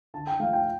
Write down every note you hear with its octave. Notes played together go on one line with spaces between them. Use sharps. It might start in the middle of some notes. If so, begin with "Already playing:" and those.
D3 A5
G5
F3 A3 F5
G5